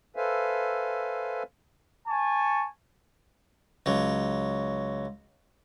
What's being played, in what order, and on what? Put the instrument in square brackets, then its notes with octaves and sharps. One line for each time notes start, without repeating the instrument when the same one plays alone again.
[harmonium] A4 B4 C5 E5 F5 G#5
[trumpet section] G#5 A5 C#6
[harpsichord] C#2 F#3